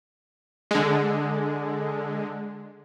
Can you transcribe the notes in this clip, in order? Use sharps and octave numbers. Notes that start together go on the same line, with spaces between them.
D3 G#3